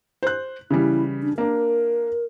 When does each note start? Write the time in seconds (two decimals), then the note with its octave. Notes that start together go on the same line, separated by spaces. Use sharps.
0.23 C5 F#6
0.70 C#3 E3 G3 E4
1.22 D4
1.38 A#3 D4 A#4